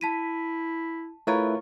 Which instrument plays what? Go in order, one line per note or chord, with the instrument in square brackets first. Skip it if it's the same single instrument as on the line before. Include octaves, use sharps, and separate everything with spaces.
[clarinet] E4 [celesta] A5 B6 D#7
[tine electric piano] A3 E4 B4 [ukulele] F4 A#4 C#5